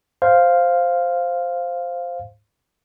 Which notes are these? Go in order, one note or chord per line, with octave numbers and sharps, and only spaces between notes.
C5 F5